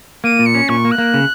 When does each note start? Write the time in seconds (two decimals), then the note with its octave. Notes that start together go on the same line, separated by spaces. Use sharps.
0.24 A#3 D#7
0.39 A#2
0.46 C#7
0.55 C#4
0.69 A#2 C#6
0.85 A#3
0.92 F#6
0.98 A#3
1.14 C#3